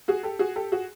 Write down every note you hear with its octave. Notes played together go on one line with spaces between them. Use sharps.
F#4 G#4
G4 A4
F#4 G#4
G4 A4
F#4 G#4